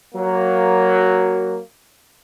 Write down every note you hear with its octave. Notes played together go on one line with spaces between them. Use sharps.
F#3 A#3